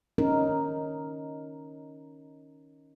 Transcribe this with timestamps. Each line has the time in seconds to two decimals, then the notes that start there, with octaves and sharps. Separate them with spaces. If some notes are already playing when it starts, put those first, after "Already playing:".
0.18 C#4 D#4 A#4